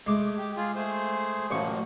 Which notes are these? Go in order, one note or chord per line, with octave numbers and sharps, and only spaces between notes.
G#3 A3 D6
G4
F4 G#4
A3 G#4 C5
A1 F3 F#3 A#3 C#6